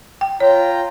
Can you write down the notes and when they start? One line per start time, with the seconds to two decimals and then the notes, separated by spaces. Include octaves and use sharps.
0.21 G5
0.40 F4 C#5 G5 A#5